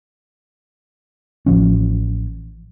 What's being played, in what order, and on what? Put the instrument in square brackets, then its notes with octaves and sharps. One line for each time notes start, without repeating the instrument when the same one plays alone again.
[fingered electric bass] A1 F3 C#4